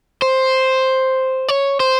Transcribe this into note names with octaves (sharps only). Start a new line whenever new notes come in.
C5
C#5
C5